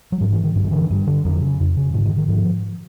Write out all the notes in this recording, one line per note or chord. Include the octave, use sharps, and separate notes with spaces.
F#3
G#2 F3
E3
D#3
G2 E3
D#3
D3 E3
G2
D3
F2 F#3
C#3
F2
C#3
G#2 D3
D#3
D#3
G#2 F3